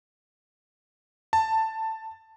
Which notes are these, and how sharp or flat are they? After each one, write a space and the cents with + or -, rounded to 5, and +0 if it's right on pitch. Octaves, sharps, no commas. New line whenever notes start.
A5 +10